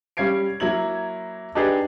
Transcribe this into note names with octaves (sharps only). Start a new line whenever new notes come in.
G3 C#4 F5 G#6 C7 D7
F#3 A#3 E4 G#6 F#7
D4 D#4 G4 G#4 B4